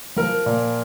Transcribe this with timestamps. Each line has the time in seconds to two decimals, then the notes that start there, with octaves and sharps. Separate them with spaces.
0.16 F3 A#4
0.46 A#2